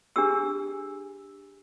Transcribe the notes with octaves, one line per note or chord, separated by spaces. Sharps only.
D4 G4 G#4 E6